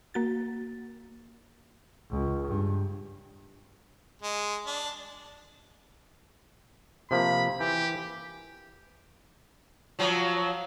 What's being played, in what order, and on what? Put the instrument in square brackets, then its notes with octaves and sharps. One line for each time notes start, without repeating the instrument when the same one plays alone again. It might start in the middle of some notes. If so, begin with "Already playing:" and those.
[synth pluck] A#3 F#4 A6
[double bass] C#2
G2
[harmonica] G#3
D4
[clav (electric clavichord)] C3 F3 A#3 [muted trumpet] B5
[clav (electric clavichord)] E3 [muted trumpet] G4
[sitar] F3 F#3